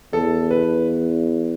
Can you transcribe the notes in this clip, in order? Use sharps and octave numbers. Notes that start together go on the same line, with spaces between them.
E2 A4
B4